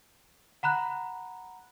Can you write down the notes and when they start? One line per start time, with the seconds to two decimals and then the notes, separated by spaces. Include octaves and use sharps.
0.63 F#5 A#5 B5 F#6